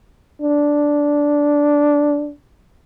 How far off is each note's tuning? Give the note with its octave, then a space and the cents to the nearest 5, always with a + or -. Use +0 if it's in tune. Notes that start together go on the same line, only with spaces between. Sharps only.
D4 -5